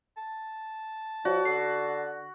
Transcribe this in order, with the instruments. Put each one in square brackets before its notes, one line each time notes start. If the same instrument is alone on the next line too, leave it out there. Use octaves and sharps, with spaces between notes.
[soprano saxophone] A5
[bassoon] F3 [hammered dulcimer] F#4 [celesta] C#5 D5
[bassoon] D3 [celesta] C7